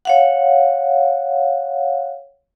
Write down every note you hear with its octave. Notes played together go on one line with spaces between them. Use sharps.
C#5 F5 F#5